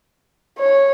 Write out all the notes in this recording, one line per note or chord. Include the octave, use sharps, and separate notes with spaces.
C#5